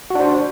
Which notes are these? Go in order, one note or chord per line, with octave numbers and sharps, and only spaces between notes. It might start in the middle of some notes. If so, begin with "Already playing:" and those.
D4 F#4 C5